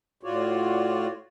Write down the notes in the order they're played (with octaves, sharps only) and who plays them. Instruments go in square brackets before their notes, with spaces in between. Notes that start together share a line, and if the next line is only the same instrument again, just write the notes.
[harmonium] A2 F4 F#4 C#5 D5